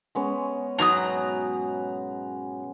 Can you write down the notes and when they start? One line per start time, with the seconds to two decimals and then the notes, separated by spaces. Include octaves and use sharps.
0.15 G#3 B3 C#4
0.79 G#2 B2 F#3 A#5 D#6